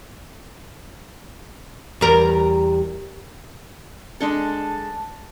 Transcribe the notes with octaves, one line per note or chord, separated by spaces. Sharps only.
E2 G3 A#4
G#3 D4 A4 A5